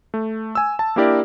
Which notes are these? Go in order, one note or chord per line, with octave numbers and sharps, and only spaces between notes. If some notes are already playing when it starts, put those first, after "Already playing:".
A3
G#5 E6
A5
A#3 D4 E4 G4 A#4 D5